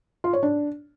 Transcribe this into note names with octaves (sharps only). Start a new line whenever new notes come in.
F4
C#5
D4